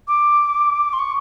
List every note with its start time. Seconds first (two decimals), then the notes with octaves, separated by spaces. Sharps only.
0.08 D6
0.93 C6
0.99 C#6